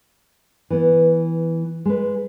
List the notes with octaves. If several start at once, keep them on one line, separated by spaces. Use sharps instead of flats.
E3 B3
G#3 B4